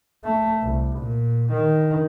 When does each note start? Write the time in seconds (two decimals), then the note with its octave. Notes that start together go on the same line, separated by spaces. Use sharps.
0.25 A3
0.62 C2
0.99 A#2
1.52 D#3